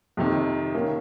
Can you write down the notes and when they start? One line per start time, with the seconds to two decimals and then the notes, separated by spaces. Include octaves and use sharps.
0.17 F2 C3 D#3
0.74 D#3 A#3 C#4